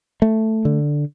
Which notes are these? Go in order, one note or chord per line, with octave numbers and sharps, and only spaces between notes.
A3
D3